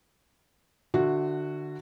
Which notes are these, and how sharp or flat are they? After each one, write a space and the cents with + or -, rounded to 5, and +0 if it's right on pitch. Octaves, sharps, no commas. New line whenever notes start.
D3 +25 F#4 -5 E5 +0